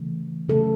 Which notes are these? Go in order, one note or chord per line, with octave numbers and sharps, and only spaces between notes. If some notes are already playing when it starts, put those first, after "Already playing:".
Already playing: C#3 E3 A3
C#3 F#3 A3 A4